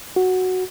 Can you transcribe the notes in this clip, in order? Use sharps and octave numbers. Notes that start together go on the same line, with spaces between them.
F#4